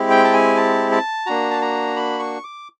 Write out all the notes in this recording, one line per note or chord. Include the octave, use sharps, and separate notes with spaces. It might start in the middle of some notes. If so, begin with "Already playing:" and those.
Already playing: G#3 C4 E4 G4
G5
A5
G#5
A5
A5
A#3 D4 F#4 A#5
A5
A#5
B5
C#6
D6